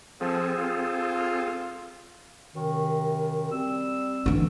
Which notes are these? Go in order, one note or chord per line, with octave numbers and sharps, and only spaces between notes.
F3 C4 G#4 A4
F4
F#2 C3 D#3
G3 C4 E6
D3 E3